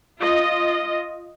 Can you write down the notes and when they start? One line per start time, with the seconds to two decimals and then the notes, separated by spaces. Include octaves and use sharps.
0.19 F4 D#5